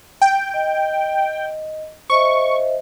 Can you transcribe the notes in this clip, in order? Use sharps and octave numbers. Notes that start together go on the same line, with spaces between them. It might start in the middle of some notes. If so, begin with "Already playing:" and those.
G5
D#5
C5 D#5 E5 C#6